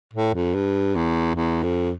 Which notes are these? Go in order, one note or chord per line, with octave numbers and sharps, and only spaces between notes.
A2
F2
G2
E2
E2
F2